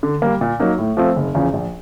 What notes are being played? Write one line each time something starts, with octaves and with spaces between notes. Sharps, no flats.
D3
G3 A#3
A#2
F#3 A#3 D#4
A2
F3 A3 C4 F4
F#1
E2 C#3 F3
A#1